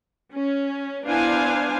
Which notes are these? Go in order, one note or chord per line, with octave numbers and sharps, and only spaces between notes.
C#4
B3 D4 E4 C5 F5 G#5